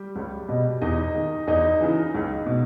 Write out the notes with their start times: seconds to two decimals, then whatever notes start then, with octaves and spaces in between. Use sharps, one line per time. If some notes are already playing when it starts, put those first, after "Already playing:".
Already playing: G3 G4
0.16 C#2
0.49 B2
0.82 E2 D#4 D#5
1.15 D#3
1.47 E2 D#4 D#5
1.81 C#3 E3
2.14 C#2
2.46 B2